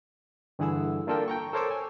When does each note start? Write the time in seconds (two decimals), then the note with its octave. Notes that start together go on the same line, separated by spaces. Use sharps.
0.59 G2 D3 E3 G#4 F#5 E6
1.07 A#3 D4 F4 A4 A#4 G5
1.28 G5 A#5 C#6
1.53 A4 A#4 C5 C#5 D6 E6
1.71 G#5